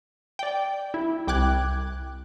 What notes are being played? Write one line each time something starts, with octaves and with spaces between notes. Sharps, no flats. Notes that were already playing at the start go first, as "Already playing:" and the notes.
D5 G5
E4
C2 G5 D6 F#6 G#6